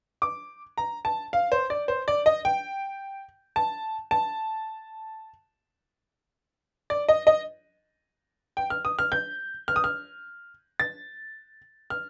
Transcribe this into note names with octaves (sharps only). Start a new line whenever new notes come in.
D6
A#5
A5
F5
C5
D5
C5
D5
D#5
G5
A5
A5
D5
D#5
D#5
G5
F6
D#6
F6
G6
F6
D#6
F6
A6
F6